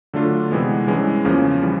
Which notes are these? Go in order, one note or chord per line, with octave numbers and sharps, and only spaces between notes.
D3 F#3 A3 D4 F4
C3 E3 G#3 B3
G2 E3 G#3 C#4
E2 C#3 F3 A#3 C#4
E3 G3